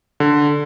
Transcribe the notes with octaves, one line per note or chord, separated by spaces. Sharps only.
D3